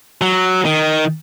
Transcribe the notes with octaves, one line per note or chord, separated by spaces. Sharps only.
F#3
D#3